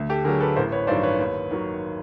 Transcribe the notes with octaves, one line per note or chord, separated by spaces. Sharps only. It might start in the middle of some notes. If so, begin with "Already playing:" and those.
Already playing: D2
G4 A4
D3 F#3 G#4 A#4
A4 B4
A1 A#4 C5
B4 C#5
G2 D#3 F#3 C5 D5
B4 C#5
D#2
D#3 F#3